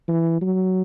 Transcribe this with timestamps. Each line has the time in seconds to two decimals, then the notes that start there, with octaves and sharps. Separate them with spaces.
0.08 E3
0.41 F#3